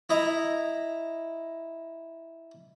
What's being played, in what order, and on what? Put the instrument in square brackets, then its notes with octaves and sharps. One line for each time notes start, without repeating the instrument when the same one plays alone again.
[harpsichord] E4 D#5 A#5